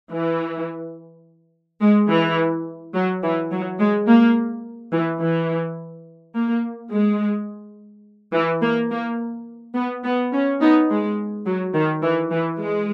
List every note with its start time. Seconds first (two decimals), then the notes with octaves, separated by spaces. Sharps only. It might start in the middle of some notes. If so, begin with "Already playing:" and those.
0.11 E3
1.81 G#3
2.09 E3
2.94 F#3
3.23 E3
3.51 F#3
3.80 G#3
4.08 A#3
4.93 E3
5.21 E3
6.35 A#3
6.91 G#3
8.33 E3
8.62 A#3
8.91 A#3
9.75 B3
10.04 B3
10.33 C#4
10.61 B3 D#4
10.89 G#3
11.46 F#3
11.74 D#3
12.02 E3
12.31 E3
12.59 G#3